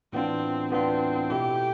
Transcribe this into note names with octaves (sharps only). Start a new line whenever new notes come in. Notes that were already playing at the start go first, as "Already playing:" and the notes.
A2 E3 B3 C4 D4 F4
A2 E3 B3 C4 D4 F4
B2 A3 E4 G4